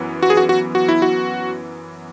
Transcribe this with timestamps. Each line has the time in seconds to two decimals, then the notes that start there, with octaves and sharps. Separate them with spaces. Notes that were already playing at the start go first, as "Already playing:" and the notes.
Already playing: F#2 E3 B3
0.23 F#4
0.30 G#4
0.37 F#4
0.49 F#4
0.75 F#4
0.88 E4
1.02 F#4